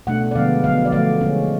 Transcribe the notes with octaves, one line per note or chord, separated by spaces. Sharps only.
B2 A3 D4 F#5
D5
D3 F3 G#3 B3 F5
D3 F#3 B3 F5
D5
D3 F3 A3 F5
D3 G#3 C#4